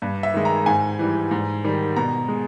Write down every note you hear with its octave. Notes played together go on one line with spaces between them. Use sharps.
G2
E5
D#3 G#3
A#5
G#2 G#5
E3 G3
G#2
D#3 G3
B2 A#5
G#3